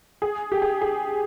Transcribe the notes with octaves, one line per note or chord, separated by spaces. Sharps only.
G#4
G4
G#4
G#4